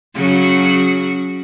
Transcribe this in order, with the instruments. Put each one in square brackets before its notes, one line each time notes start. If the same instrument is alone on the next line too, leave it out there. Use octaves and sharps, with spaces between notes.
[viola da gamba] C#3 F#3 F#4